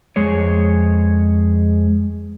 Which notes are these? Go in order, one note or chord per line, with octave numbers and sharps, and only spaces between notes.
F2 G#3 G#4 C#5